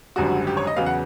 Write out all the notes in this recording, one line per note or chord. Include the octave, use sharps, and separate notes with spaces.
G#1 F#2 D3 G3 F#4
G4
C#5
D#5
E2 C#3 F#3 B3 F5
F#5